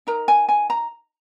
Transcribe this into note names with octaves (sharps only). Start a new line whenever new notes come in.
D#4 A#4 A#5
G#5
G#5
A#5